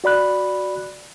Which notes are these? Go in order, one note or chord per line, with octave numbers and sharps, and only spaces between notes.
F#4 D5 B5 F#6